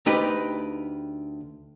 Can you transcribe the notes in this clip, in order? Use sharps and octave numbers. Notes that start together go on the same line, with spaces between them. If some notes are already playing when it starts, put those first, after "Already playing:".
D2 D#4 G4 B4